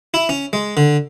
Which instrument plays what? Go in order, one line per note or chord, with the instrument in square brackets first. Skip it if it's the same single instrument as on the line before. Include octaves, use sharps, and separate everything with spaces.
[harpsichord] E4
C#4
G#3
D3